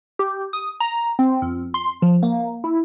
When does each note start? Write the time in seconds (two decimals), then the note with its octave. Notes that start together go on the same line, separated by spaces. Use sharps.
0.19 G4
0.53 D#6
0.80 A#5
1.19 C4
1.42 F2
1.74 C6
2.02 F3
2.23 A#3
2.64 E4